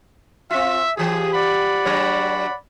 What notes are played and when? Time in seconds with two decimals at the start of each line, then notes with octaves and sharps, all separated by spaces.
0.50 C4 F4 E5
0.97 E3 G4 G#4
1.33 D5 F#5 B5
1.85 F#3 D4 C#5